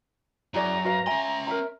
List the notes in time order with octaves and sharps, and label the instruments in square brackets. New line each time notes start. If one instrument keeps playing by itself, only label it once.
[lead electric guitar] F#2 [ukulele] E4 G#4 D5 [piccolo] A#5
[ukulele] F#4 B4 F5
[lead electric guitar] C#4 C6 [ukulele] E5 G5 G#5
[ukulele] A#4 E5 A#5